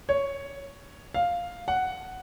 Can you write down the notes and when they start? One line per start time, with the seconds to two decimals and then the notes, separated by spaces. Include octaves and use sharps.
0.09 C#5
1.14 F5
1.68 F#5